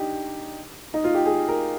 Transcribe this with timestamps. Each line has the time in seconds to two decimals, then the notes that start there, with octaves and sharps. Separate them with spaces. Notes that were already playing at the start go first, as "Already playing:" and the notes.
Already playing: D4 D#4 G4
0.94 D#4
1.04 F4
1.15 G4
1.26 G#4
1.48 A#4